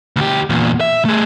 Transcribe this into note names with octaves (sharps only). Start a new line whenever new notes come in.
D2 G4
E2 A#2
E5
A3 G#4